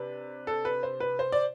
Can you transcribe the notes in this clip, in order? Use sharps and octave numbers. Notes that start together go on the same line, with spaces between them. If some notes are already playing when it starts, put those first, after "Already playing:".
Already playing: C3 D4 B4
A4
B4
C5
B4
C5
D5